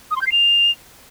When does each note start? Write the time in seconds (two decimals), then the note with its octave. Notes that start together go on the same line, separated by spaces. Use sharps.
0.11 D#6
0.16 C6
0.21 G6
0.27 C7
0.32 F7